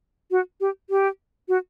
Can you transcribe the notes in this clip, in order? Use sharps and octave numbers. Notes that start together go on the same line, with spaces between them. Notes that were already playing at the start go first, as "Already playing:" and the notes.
F#4
G4
G4
F#4